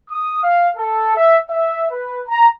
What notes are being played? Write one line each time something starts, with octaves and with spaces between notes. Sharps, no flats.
D#6
F5
A4
E5
E5
B4
A#5